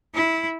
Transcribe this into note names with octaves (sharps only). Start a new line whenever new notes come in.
E4